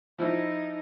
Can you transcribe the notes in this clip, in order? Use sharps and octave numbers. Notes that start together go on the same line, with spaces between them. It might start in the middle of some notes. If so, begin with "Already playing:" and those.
F3 D#4 E4